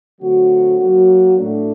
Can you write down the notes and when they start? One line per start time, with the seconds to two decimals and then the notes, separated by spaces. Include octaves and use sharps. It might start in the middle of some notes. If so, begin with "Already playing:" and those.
0.21 D3 F#3 A3 C4 F#4
0.79 F#3 A#3 F#4
1.38 A2 A3 D4